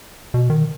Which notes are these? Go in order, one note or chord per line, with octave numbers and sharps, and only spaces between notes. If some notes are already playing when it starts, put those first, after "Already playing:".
B2
D#3